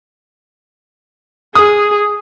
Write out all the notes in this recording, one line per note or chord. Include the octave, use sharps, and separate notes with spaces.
G#4 D#6